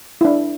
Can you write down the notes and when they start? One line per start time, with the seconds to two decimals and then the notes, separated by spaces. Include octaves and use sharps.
0.21 E4
0.25 D4